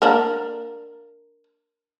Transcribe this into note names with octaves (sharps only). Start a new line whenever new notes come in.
A#3 D4 A#4